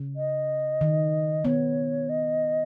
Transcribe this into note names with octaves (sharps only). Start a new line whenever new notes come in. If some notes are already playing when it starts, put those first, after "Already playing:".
Already playing: C#3
D#5
D#3
B3 C#5
D#5